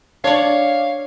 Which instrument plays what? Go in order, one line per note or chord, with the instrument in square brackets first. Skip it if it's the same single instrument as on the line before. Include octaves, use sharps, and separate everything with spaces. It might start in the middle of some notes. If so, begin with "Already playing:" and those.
[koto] D4 D5 [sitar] C#5 [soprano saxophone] F5